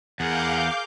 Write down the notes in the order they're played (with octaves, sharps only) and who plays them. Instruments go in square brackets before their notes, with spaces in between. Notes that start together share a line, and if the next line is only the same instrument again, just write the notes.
[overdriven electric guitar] E2 [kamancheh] G#4 A#4 [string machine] F5 D6 G6 [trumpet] F#5